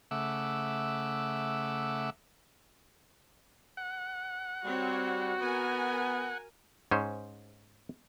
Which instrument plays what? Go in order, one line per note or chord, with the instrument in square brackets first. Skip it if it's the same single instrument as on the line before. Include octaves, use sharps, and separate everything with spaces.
[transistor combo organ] C#3 A3 E5 F#5 D6 E6
F#5
[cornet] G3 [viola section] C4 C#5 [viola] F#4
[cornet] B3 [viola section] A#4 G#5 A#5
[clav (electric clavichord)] G#2 C#4 C5